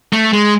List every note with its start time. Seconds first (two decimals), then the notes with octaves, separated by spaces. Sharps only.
0.13 A3
0.33 G#3